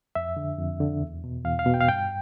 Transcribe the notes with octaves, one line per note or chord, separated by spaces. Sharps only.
F2 E5
D3
F2
D3
E2
B2
E2 F5
F5
B2
G5
F5
G2 G5